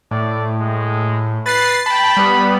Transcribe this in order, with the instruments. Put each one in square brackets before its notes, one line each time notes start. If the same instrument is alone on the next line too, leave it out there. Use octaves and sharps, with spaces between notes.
[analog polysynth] A2 [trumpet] D5
[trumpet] G#3
[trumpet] B4 [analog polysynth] A6 C7
[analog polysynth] G5 A5 [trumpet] B5
[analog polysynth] G3 B3